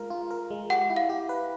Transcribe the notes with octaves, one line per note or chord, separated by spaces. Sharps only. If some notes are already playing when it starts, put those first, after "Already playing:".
Already playing: G#3 F4 A#4
F4
A#4
G#3
G4 F#5
E4
F5
G4
B4